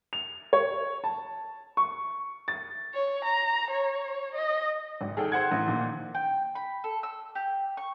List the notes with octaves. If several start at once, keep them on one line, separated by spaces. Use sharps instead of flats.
F7
C#5
A5
C#6
A6
C#5
A#5
C#5
D#5
G#1
D#3 G#4 A4 G5
C5 F#5 G#6
A1
A#2 D#3
G5
B5
A4
E6
G4
C#6